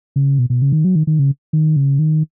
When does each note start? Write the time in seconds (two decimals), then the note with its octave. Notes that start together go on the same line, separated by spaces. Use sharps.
0.16 C#3
0.39 B2
0.50 B2
0.62 C#3
0.72 D#3
0.84 F#3
0.95 D#3
1.07 D#3
1.19 C#3
1.53 D#3
1.76 C#3
1.99 D#3